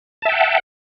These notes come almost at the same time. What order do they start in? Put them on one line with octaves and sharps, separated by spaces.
A5 E5 G5 F#5